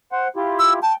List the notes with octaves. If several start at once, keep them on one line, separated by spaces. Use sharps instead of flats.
C5 F#5
E4 F4 G4
E6
G5 A5